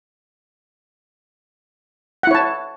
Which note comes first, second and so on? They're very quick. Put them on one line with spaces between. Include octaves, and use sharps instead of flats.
F#5 E4 C#5 A5